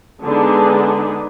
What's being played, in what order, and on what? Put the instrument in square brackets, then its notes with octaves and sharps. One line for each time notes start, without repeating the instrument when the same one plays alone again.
[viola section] D3 G#3 B3 D4 D#4 G#4